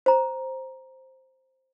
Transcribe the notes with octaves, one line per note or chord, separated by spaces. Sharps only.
C5 A#5